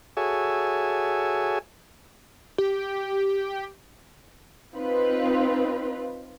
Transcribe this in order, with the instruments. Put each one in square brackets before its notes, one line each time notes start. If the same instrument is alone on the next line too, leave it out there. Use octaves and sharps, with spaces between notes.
[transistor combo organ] F#4 G#4 A4 C#5 E5 G#5
[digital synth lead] G4
[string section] C4 D#4 F4 B4